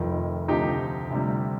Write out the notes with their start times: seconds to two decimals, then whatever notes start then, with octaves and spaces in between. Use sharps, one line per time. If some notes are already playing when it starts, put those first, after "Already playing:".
Already playing: F1 F2 D#3
0.48 D2 C3 F3 D#4 G4
1.10 D2 C3 G3